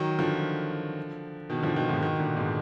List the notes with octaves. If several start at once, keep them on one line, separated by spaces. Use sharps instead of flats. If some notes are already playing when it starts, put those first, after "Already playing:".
Already playing: D#3 F#3
D3 F3
B2 D#3
D3 F3
B2 D#3
G#2 B2
B2 D#3
A#2 D3
G#2 B2